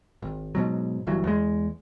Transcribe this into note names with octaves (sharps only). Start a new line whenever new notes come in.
G#1
G#2 B2 F#3
G1 G2 E3 F#3
E2 G#3